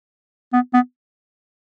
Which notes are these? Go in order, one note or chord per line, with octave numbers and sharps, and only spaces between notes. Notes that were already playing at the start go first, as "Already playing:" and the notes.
B3
B3